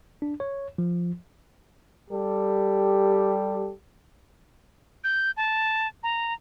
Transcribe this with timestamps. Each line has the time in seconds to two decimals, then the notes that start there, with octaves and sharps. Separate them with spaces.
0.22 D4
0.40 C#5
0.78 F3
2.11 G3 G4 A4
5.04 G6
5.37 A5
6.03 A#5